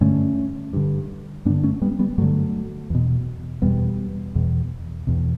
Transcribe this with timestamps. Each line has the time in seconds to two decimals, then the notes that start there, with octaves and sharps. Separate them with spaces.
0.01 G2 D3 A3 C#4
0.73 G2 D3
1.45 G2 B3 D4
1.50 D3
1.63 A3 C#4
1.82 G3 B3
1.99 G3 B3
2.18 G2 D3 F#3 A3
2.90 E2 B2
3.62 E2 B2 G3 B3
4.35 E2 B2
5.07 E2 B2